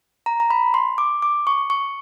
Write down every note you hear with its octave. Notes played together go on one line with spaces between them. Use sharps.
A#5
A#5
B5
C6
D6
D6
C#6
C#6